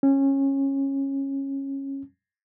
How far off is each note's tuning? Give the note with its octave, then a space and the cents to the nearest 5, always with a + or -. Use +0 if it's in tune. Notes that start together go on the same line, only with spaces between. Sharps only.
C#4 -20